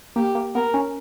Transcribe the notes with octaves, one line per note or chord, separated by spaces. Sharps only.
A#3 G4
A#3
B3 A#4
C#4